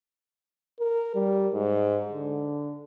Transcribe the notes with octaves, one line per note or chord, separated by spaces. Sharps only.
A#4
G3
G#2
D3